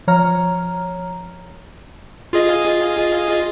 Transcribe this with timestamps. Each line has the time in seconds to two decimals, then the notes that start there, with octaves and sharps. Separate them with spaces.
0.07 F3 C#5 A#5 F6
2.33 F4 G#4 D#5